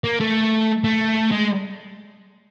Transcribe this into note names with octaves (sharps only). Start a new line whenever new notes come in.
A#3
A3
A3
G#3